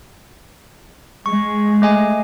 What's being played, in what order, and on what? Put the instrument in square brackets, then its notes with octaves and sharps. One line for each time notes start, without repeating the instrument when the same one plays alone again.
[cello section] G#3 [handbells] C#6
[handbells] A3 D#5 G#5